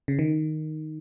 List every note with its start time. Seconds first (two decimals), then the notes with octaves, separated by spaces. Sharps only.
0.08 C#3
0.19 D#3